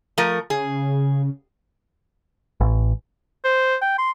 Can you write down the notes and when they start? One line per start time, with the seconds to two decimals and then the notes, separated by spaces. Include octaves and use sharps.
0.18 F3 A3 A#4
0.50 C#3 G#4
2.61 A1
3.45 C5
3.81 G5
3.99 C6